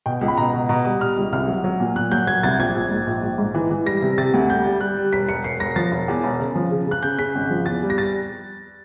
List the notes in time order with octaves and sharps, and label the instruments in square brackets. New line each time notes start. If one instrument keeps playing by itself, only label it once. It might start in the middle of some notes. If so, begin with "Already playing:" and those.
[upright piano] B2 G5
C#2
B5
B2 A#5
B2
B2 A#5
G3 D#6
G3 F6
C#2
C2 F6
F#3
F#3
A#2
A#2 F#6
F#3 G6
F#3 G#6
C2 A6
A#1 G#6
A#1
G#2
A#1
A#1
G#2
E3
E3
G3 A#6
C3
C3 A6
D2
G3 G6
G3
G3 F#6
G3
E1 B6
E1 C#7
E1 C7
E1 A#6
F3 A6
E1
E2
E1
C#3
F3
C#3
C#3 F#6
C#3 G6
C#3 B6
G#1
F3
E2 A6
G3
A#6
A6